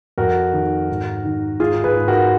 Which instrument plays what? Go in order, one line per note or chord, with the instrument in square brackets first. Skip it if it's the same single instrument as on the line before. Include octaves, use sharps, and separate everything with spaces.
[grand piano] F2 F#4 A#4
D#3
G#2
D#3
G#2 F4 G#4
G#4 B4
G#2
F#4 A#4